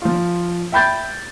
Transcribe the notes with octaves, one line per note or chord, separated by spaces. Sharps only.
F3 F4
E5 G5 B5 G6 A6